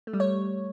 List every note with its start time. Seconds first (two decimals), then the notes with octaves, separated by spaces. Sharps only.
0.07 A3
0.14 G3
0.20 C#5